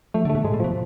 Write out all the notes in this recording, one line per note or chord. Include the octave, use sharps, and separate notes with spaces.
F3 A3
D3 A3
B2
G#2 G#3
A2
B2 F3